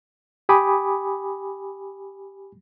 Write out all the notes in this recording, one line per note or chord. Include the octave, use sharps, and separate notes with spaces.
G4 G5 G#5 B5 D6 D#6